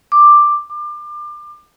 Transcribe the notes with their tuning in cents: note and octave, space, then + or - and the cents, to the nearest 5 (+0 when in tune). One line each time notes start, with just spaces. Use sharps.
D6 +10
D6 +30